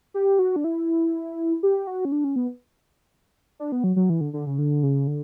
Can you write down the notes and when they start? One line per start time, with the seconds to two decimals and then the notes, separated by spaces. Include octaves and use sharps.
0.14 G4
0.39 F#4
0.56 D4
0.64 E4
1.63 G4
1.87 F#4
2.05 C#4
2.12 D4
2.24 C#4
2.36 B3
3.60 D4
3.72 B3
3.84 F#3
3.96 F#3
4.10 E3
4.21 D3
4.33 D3
4.46 C#3
4.59 D3
4.83 C#3
5.07 D3